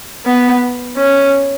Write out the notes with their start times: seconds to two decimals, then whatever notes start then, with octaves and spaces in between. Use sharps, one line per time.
0.26 B3
0.97 C#4